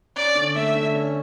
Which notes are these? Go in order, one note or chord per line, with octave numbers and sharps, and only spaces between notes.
C#4 D5
D3
A3 E5
D3
C#4